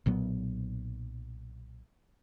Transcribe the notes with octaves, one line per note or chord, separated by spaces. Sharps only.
B1 A#2 F#3 B3